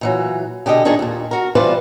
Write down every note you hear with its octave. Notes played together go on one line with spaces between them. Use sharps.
A#2 E3 F#3
B2 D3 G4 G#4 D#5
A#2 D#3 D4 D#4 G#4
D#2 A#2
F#4 A#4
E3 G3 F4 B4 C5 D5